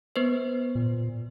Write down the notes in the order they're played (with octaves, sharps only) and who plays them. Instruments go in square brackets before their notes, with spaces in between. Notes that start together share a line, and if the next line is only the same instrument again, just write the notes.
[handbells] B3 B4 C5
[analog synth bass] A#2